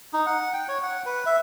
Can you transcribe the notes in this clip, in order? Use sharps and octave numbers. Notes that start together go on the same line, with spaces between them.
D#4
F#5
G5
C#5
F#5
B4
E5